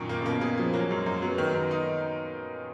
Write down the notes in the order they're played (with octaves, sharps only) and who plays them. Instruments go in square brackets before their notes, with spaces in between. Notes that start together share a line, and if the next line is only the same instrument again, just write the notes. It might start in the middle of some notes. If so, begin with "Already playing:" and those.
Already playing: [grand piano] F#2 D#3 [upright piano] A#2
[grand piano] A#3
[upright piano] C#3
[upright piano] B2 [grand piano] A#3
[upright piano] C#3 [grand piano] G#4
[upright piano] F3 [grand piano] G#4
[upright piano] F#3 [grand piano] A#3
[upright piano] F#3
[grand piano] F#2 [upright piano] G#3
[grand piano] F#2 [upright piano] A#3
[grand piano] F#3 [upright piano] B3
[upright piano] B3
[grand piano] D#3
[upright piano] B3
[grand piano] D#3
D#4